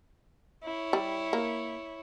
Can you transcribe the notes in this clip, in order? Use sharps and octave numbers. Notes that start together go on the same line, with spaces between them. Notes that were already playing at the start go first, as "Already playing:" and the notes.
E4 C#5
G3
A#3